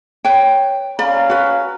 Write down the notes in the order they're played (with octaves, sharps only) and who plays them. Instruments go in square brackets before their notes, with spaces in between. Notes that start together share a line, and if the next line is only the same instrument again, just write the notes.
[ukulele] B4 C#5 G5
[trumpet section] C#4 F5 A#5 [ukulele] D5 B5
[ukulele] F#4 B4